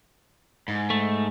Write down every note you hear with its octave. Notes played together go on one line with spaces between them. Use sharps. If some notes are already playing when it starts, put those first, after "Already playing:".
G#2
A3